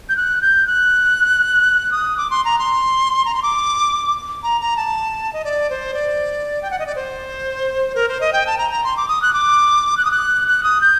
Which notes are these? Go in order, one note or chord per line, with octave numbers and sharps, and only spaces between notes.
G6
F#6
G6
F#6
D#6
D6
C6
A#5
C6
A#5
C6
D6
A#5
A#5
A5
D#5
D5
C5
D5
G5
F#5
D#5
D5
C5
A#4
C5
D#5
G5
A5
A#5
A#5
C6
D6
D#6
F#6
D6
F#6
D#6
F#6
F#6
D#6
G6